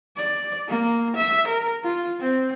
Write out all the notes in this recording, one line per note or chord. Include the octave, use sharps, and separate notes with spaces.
D5
A#3
E5
A#4
F4
C4